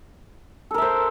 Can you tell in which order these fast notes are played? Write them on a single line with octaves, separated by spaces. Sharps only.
A4 A#4 E5 C5